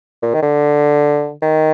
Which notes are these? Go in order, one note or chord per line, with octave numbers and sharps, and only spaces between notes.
A#2
D#3
D3
D#3